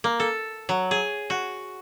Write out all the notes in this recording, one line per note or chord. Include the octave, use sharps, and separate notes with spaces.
A#3
A4
F#3
G#4
F#4